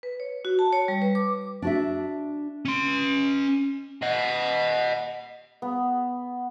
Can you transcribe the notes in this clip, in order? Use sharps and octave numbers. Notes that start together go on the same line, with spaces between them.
B4
C#5
F#4
A5
C#5
G3
B4
D6
D4 F#4 E5
C#4 C6
D#5 F#5
B3